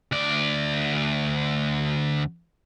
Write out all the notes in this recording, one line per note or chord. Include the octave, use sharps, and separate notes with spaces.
D2 D5